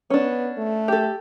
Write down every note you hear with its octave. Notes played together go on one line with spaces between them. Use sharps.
B3 C#4 D4
A3
G4 A4